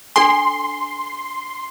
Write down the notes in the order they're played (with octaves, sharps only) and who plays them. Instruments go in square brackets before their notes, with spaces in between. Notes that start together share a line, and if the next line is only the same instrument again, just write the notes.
[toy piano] D4 A4 G#5 [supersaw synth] C6